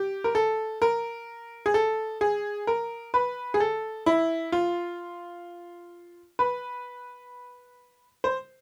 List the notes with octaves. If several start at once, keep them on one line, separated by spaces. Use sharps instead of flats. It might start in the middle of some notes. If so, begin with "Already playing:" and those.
Already playing: G4
A#4
A4
A#4
G#4
A4
G#4
A#4
B4
G#4
A4
E4
F4
B4
C5